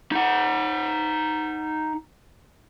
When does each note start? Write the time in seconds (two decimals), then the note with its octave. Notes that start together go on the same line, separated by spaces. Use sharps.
0.12 D#4 F#5